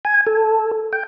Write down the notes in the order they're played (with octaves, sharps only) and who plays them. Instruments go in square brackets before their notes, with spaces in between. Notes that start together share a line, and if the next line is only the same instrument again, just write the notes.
[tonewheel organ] G#5
A4
G5